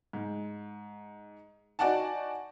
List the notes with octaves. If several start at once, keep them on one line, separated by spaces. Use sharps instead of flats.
G#2
D#4 F#4 D5 F#5 G#5 A5